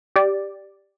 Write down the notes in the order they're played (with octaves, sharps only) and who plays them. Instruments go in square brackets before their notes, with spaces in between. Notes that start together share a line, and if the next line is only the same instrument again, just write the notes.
[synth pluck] G4 D5